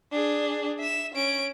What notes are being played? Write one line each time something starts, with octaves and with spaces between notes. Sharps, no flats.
D4 G#4
E5 E7
C#4 D7